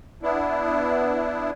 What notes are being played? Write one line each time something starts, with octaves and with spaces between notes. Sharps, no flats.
B3 D4 E4